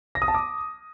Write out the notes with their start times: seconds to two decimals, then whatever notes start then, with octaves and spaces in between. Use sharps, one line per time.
0.15 A#6
0.22 D#6
0.28 A5
0.34 D6